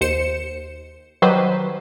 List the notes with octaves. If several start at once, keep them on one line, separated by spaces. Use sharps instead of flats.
D#2 C5 C#7 E7
D#3 F#3 G3 B4 C5